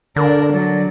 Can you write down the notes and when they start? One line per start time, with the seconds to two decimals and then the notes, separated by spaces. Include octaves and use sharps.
0.16 D3 D4 A#4 D5
0.52 F#3 D5